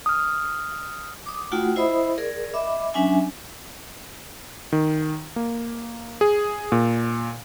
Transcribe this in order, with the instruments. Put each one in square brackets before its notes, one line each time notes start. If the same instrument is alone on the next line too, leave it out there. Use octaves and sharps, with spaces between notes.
[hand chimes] D#6 F6
[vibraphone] D6 D#6
A3 D#4 F4 F#4 F#5 G5
E4 C5 D#5 E5 B5 D#6
G#4 A#4 D5
D#5 E5 B5 D6
F#3 C#4 D4 E5 G#5
[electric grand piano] D#3
A#3
G#4
A#2